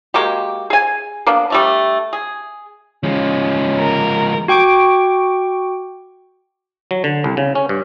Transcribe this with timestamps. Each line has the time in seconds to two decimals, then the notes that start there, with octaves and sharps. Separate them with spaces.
0.14 G#3 A#3 F#4 G4
0.70 G#4 G#5
1.27 A#3 B3 D4
1.50 G3 A3 D4
2.13 G#4
3.03 F3 G#3 C#4
3.79 A#4
4.48 F#4 G5 C#6 D6 D7
6.91 F#3
7.04 D3
7.24 C2
7.37 C#3
7.55 C#4
7.69 G2